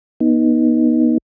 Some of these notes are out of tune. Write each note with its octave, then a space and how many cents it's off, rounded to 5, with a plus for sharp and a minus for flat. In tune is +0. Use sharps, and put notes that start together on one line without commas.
B3 -30 D#4 +0